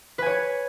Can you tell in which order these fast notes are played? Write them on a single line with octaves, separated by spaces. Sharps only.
B4 G#5 C#5